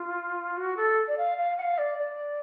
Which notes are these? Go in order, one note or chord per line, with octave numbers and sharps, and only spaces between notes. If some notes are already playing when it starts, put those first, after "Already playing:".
Already playing: F4
F#4
A4
D5
F5
F5
F#5
F5
D5
D5